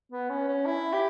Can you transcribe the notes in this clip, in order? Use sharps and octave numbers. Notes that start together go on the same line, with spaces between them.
B3
C#4
C#4
E4
G4